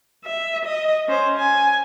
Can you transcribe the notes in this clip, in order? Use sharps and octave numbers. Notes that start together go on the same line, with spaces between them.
E5
D#5
C#4 C5
G#5